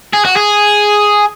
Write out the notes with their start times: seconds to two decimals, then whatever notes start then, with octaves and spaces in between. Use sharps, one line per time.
0.14 G#4
0.25 F#4
0.37 G#4